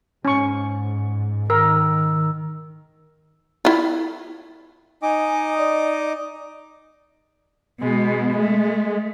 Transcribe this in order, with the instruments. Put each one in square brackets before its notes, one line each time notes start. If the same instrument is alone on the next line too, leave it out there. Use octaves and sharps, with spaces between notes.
[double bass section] G#2 [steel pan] C#4 C#6
[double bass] D#3 [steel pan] A#4 [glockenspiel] E6
[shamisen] E4 F4
[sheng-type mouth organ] D#4 D#5 D6 [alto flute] G#5
[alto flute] D5
[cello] B2 [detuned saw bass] G#3
[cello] A3